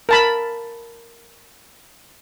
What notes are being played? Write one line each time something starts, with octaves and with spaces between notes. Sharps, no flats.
A#4 A5 B5